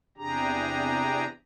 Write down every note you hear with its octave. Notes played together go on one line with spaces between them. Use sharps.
E2 C3 D4 G4 G#4 A#5